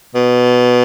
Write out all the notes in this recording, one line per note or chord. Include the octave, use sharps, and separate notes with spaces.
B2